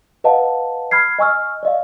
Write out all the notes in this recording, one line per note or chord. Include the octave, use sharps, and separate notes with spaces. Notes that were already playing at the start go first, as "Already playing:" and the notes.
B4 D#5 F5 F#5 A5
B5 F6 G#6 C7
D#5 G#5 C#6 E6 F6
D5 D#5 F5